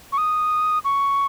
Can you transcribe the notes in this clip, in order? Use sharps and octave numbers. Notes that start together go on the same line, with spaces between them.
C#6
D#6
C#6